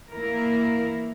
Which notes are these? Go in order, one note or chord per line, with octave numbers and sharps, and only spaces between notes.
E3 A#3 E4 A#4